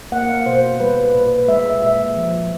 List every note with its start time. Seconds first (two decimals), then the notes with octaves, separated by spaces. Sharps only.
0.12 A#3 F#5
0.29 F5
0.46 B2 C5
0.80 G3 B4
1.14 A#2 B4
1.48 G#3 E5
1.66 E5
1.82 A#2 E5
2.17 F3